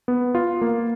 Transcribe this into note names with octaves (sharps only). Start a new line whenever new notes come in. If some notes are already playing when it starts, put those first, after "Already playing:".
B3
F4
A#3